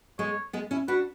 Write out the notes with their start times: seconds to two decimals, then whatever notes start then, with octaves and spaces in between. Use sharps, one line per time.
0.19 G#3 B3 C#5
0.53 G#3 B3
0.71 C#4 E4
0.88 D4 F#4 B4